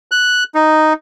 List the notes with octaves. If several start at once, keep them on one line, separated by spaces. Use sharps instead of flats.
F#6
D#4